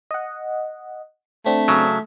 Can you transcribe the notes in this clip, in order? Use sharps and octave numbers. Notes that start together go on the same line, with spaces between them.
D#5 F#5
A3 C4 D4
C#3 F#3